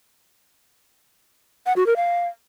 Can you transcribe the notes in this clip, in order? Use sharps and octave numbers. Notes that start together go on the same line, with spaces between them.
F#5
F#4
A#4
F5